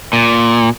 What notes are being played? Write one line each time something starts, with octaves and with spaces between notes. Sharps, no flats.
A#2